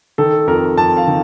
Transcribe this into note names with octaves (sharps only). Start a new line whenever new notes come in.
D#3 A4
F2 A#4
F2 A5
F5
D#3